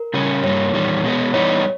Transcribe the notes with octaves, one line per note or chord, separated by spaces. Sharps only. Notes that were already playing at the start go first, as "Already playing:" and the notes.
Already playing: A#4
C#3 G3 C#4
G2 G3 A#3 C#5
E2 D#3 G3
B2 G#3 B3
E3 G3 B3 D#4 C#5